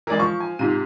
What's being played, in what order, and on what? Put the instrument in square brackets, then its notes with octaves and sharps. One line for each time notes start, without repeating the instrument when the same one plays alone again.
[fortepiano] E3 D5 [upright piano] G#3 A#4
[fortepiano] F3 [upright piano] C#6
[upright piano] G#5
[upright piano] G#2 F4 D#7 [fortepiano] C3